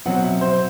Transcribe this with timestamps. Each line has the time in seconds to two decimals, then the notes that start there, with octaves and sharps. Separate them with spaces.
0.05 B2 F#3 C4 F#5
0.24 E5
0.41 C5